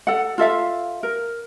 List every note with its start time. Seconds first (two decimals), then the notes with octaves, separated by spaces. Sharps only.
0.07 A4 F#5
0.38 F4 A4 E5 F5
1.03 A#4